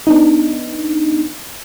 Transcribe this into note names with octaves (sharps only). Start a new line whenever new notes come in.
B3 D4 D#4